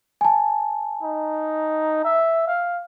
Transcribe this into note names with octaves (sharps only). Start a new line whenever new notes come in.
G#5 A5
D#4
E5
F5